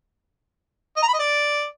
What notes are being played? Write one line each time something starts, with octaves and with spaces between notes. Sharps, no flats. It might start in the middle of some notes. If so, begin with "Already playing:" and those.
D#5
A#5
B5
D#5
D5